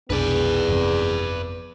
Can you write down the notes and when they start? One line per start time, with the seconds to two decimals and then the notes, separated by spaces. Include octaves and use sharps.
0.10 F1 B1 E3 B3 D4 G#4 B4 D5
0.69 G1 F2 C3